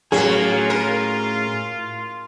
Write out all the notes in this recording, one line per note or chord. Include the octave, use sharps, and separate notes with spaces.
A2 F#3 A#3 C#4 F4 G#4
A#4